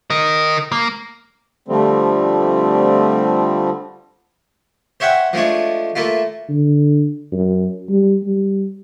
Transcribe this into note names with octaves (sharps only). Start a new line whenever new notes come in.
A#4 D#5
A#3
D3 F3 G3 A3 C4
C5 C#5 E5 F#5 G5
F3 G#3 A3 D4 C#5
A3 A#3 E4 F4
D3
F#2
G3
G3